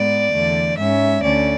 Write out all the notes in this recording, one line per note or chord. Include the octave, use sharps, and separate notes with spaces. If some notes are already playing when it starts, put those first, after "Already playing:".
Already playing: G#2 G#3 B3 D5
E2 D3 A3
G#2 G#3 C#4 E5
D2 D3 A3 C#4 D5